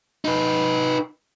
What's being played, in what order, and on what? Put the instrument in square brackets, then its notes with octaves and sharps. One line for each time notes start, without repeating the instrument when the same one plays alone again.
[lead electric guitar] D#4 B4